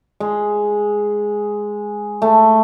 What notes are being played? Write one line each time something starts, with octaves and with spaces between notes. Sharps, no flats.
G#3
A3